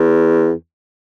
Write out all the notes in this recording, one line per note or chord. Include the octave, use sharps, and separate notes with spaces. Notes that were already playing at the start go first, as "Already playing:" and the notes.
Already playing: E2